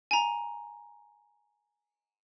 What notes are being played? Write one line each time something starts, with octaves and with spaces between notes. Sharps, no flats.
G#5 A#5